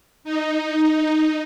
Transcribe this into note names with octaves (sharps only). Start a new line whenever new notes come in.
D#4